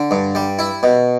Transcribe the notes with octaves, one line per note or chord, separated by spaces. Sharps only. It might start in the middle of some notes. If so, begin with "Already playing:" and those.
Already playing: D3
G2
G3
E4
B2